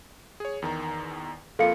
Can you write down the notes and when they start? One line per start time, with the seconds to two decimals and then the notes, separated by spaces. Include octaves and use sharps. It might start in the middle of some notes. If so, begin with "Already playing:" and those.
0.40 G#4 C#5
0.62 E2 D#3 A#5
1.59 F2 A#3 F4 A4 F5 C#7